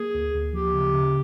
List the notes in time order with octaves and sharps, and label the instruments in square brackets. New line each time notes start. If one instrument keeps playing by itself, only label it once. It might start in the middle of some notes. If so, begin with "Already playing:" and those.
Already playing: [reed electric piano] A#3 [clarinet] G#4
[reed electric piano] D2
D2
[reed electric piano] F3 [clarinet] G4
[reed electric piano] C#3
C#3